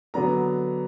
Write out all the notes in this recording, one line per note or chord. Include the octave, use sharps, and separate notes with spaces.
D3 F#3 B3 D4 A#5